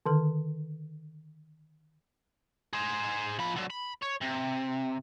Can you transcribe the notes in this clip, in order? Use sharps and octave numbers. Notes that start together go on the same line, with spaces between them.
D3 D#3 A4
G#4 C5
F3 B5
D3 F#3
B5
C#5
C3